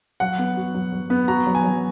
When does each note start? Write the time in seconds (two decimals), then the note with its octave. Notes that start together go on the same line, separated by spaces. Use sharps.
0.20 F#3 F#5
0.39 B3
0.57 F#4
0.74 F#3
0.93 F#3
1.10 B3
1.28 F#4 A#5
1.47 F#3
1.55 G#5
1.64 F#3